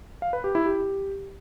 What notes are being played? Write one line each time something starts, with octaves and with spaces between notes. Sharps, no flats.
F5
B4
G4
E4
G4